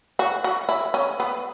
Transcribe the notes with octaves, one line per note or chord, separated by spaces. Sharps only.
F#4
F#4
E4
C#4
B3